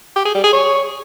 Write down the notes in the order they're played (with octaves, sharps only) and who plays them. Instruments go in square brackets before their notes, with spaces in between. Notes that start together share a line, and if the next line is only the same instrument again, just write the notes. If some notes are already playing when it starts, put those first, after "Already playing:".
[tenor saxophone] G4
G#4
G3
G#4
C#5